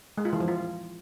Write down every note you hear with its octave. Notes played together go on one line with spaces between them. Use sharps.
G#3
F4
E3
F3
F4